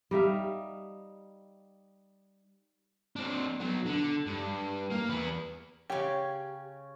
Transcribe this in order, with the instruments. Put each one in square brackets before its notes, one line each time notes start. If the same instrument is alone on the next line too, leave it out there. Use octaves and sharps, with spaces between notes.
[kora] G3 D#4 E5 F5
[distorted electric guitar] C4 D4
B2 F#3
D3
G2
A#3
E2 B4
[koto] C#3 C#4 [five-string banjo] G4